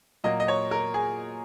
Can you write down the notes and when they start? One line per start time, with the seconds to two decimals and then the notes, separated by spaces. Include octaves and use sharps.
0.24 A#2 F#3 A#3 D#5
0.40 D#5
0.48 C#5
0.71 A#4
0.94 G#4